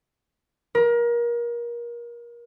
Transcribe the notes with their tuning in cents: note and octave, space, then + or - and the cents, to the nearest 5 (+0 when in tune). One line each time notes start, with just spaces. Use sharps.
A#4 +30